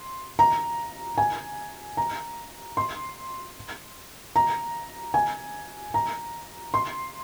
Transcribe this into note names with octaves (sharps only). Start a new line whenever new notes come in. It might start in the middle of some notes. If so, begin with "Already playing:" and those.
Already playing: C6
A#5
G#5
A#5
C6
A#5
G#5
A#5
C6